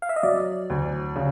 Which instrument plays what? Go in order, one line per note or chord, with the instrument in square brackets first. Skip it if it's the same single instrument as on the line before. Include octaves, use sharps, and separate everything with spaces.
[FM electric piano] F5
E5
D#5
[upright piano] F#3 [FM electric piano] D5
[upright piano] D2
C#3